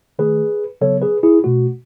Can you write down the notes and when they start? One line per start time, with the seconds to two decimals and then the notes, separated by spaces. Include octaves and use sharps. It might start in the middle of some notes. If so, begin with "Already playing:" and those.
0.19 D#3 A3 G#4 B4
0.81 C#3 F#3 B3 A4 C#5
1.02 G#4 B4
1.23 E4 G#4
1.44 B2 A3 F#4